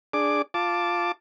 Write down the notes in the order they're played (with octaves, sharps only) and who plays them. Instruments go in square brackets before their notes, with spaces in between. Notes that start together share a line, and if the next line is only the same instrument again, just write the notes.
[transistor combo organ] D4 G#4 D6
F4 A5 D6